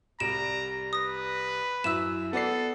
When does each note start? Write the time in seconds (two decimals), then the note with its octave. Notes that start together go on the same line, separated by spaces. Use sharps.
0.20 C2 G3 A#5 D7 E7
0.93 B4 D#6 A#6
1.84 F#2 E4 E5 E6 E7
2.33 B3 A4 D5 C7